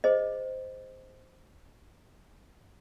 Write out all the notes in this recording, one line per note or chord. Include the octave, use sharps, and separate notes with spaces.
G#4 C5 D#5